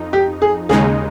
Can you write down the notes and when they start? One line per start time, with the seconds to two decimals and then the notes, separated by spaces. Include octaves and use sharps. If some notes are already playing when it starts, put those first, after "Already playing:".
Already playing: F2 D#4
0.13 G4
0.42 G#4
0.69 D#2 C#3 G#3 D#4 G#4